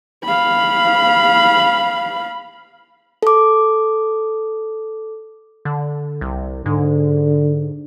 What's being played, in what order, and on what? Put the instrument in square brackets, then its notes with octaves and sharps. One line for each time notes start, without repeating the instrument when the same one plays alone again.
[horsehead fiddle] F5 B5
[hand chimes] A4 D6
[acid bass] D3
C2
[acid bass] G#2 [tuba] D3